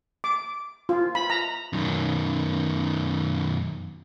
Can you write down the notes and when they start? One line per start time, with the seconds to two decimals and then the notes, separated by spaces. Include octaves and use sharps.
0.24 D6
0.89 F4
1.15 B5
1.30 A#5
1.73 F#2 D#3